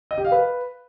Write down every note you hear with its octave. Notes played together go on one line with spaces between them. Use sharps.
D#5
G4
F5
B4